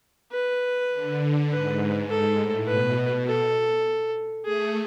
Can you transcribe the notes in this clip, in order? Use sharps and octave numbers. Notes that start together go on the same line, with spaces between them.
B4
D3
G#2 B4
G#2 A4
A2
B2 B4
A4
A3 G#4